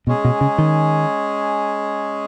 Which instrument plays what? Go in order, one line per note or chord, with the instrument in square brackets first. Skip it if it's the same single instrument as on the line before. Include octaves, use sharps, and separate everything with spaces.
[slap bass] B2 [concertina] G#3 C#4 G#4
[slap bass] B2
C#3
D#3